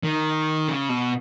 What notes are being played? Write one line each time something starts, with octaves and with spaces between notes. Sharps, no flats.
D#3
C#3
B2